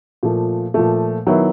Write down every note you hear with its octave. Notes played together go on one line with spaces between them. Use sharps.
A#2 F3 A3
A#2 F3 A3
D#3 F#3 B3 E4